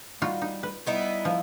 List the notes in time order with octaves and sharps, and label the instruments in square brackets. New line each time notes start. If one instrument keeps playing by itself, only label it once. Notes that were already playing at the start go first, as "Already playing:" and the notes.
[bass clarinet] G3 [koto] D#4 F4 F#4
[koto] D#4
B4
[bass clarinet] G3 [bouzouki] B3 D#4 E4
[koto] F3